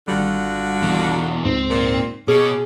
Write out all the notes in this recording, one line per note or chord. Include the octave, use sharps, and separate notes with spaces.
G#1 D3 G3 F4 F#4
E2 B2
C#2 G#2 C4
A#2
B2 C#4 G#4 D6